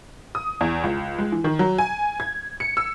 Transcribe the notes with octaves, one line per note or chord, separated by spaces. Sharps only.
D#6
E2
C#2
G#3
E3
D#3
F#3
G#5
G#6
C#7
E6